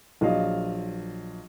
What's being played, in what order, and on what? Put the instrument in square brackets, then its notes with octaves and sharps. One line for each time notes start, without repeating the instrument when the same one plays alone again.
[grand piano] A#1 F#3 D#5 F5